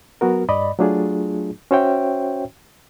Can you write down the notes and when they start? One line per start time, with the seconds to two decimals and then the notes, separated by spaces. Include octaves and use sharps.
0.21 F#3 B3 F#4 A#4
0.49 G2 D5 D#5 B5
0.79 F#3 A3 D4 F4 G#4
1.71 C#4 F#4 C5 C#5 E5 G5